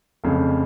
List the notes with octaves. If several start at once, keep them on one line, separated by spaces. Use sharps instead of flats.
F1 F2 C#3